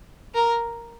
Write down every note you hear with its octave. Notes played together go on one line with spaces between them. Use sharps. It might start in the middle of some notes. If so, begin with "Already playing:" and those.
A#4